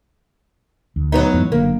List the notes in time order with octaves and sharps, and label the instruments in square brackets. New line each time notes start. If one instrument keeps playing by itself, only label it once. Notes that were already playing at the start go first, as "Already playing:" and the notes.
[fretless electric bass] D2
[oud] F#3 B3 D#4
[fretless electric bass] F2 G#2 E3
[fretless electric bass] F#1 F#2 D3 [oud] A#3